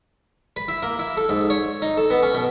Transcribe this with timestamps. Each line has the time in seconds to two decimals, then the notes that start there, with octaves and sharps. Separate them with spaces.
0.56 B4
0.68 E4
0.83 A#3
0.99 E4
1.17 A4
1.29 G#2
1.50 C#5
1.82 D#4
1.97 A4
2.10 B3
2.23 C#4
2.34 B2